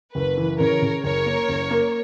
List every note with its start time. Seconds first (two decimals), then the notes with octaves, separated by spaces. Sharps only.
0.15 F#1 B4
0.37 E3
0.60 C#3 A#4 C#5
0.82 C#3
1.04 F#1 A#4 C#5
1.26 A#3
1.49 F#1
1.71 A#3